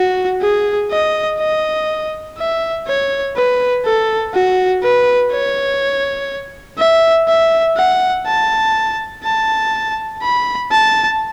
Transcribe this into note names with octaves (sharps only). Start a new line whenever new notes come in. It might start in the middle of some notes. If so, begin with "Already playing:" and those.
Already playing: F#4
G#4
D#5
D#5
E5
C#5
B4
A4
F#4
B4
C#5
E5
E5
F#5
A5
A5
B5
A5